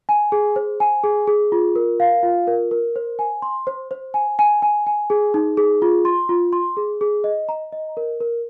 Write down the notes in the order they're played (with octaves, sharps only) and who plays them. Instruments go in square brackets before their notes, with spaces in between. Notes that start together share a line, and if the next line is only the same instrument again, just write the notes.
[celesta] G#5
G#4
C5
G#5
G#4
G#4
F4
A#4
F5
F4
A#4
A#4
C5
G#5
C6
C5
C5
G#5
G#5
G#5
G#5
G#4
D#4
G#4
F4
C6
F4
C6
G#4
G#4
D#5
A#5
D#5
A#4
A#4